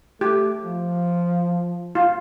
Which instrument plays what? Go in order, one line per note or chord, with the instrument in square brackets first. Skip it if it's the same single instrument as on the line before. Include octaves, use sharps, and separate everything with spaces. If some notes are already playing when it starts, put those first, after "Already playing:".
[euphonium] A3 [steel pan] G4
[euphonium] F3
[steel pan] F4